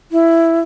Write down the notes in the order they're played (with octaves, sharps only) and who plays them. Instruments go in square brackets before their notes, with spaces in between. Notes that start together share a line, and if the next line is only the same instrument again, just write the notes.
[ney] E4